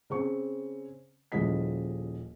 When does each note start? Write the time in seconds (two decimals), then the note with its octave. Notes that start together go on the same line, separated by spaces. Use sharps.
0.10 C#3 C4 C#6
1.32 D#1 C#3 F3 E4 D#5 B6